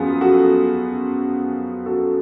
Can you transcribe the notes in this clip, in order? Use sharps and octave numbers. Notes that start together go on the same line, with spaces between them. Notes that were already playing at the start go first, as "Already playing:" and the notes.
Already playing: F#2 F3 B3 F4 G#4
F#4 A4
F#4 A4